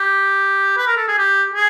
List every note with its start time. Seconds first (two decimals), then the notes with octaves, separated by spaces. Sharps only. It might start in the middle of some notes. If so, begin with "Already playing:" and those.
Already playing: G4
0.77 B4
0.87 A#4
0.97 A4
1.08 G#4
1.18 G4
1.54 G#4